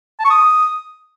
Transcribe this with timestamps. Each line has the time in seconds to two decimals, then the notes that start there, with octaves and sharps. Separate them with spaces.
0.19 A5
0.25 C#6
0.30 D#6